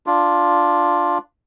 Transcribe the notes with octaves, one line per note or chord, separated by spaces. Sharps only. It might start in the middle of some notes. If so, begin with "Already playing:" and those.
D4 F4